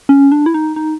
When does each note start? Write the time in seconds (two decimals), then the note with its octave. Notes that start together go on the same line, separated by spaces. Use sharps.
0.09 C#4
0.32 D4
0.46 E4
0.54 D#4
0.76 D#4